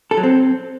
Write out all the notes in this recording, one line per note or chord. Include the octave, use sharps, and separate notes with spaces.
A4
F#3
C4